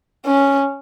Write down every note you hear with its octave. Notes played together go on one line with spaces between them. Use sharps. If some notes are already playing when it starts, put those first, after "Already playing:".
C#4